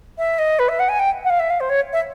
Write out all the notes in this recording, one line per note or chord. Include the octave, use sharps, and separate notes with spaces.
E5
D#5
B4
E5
F#5
G#5
G5
F#5
F5
E5
F5
C5
C#5
E5